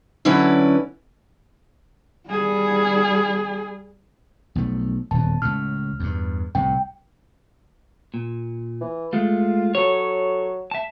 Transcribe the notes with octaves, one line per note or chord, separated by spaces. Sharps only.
D3 F#3 C#4 E4 B4 D5
G3 G#4
B1 F3 A3
D#1 E2 A5
C#2 A2 F6
E2 G2
C2 A2 C3 G5
A#2
E3
G#3 A3 F4
F#3 A4 C#5
E5 A5